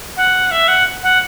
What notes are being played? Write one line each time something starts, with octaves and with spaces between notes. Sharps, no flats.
F#5
E5
F#5
F#5